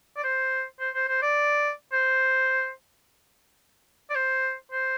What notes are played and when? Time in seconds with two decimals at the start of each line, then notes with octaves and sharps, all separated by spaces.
0.16 D5
0.24 C5
0.80 C5
0.94 C5
1.08 C5
1.22 D5
1.92 C5
4.10 D5
4.15 C5
4.71 C5